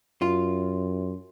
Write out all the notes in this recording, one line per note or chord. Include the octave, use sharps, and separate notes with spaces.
F#2 F4